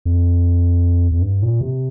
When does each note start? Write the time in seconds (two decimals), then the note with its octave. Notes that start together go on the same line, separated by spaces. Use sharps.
0.06 F2
1.12 F2
1.22 G2
1.42 A#2
1.61 C3